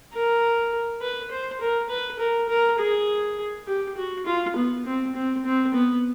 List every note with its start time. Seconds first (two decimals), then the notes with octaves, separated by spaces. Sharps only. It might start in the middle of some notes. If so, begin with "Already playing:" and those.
0.13 A#4
1.01 B4
1.31 C5
1.61 A#4
1.90 B4
2.19 A#4
2.49 A#4
2.79 G#4
3.67 G4
3.97 F#4
4.26 F4
4.56 B3
4.86 C4
5.15 C4
5.45 C4
5.74 B3